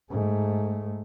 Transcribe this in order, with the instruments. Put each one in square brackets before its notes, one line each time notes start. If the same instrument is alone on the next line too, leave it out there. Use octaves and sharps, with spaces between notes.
[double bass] G#2 A3